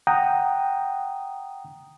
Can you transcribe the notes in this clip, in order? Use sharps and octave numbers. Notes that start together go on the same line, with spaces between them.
F#5 G5 A#5 D#6